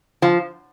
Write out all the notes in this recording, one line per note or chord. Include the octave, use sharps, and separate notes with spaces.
F3